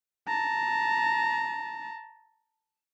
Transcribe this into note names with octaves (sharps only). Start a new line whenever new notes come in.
A5 A#5